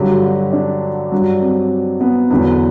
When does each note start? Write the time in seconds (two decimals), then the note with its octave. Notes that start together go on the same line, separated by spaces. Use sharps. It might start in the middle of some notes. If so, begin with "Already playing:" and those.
Already playing: G2 D3 F#3 G4
0.23 F#4
0.53 D4
1.12 G2 F#3
1.41 C4
2.01 B3
2.31 E2 D3 F#3 B3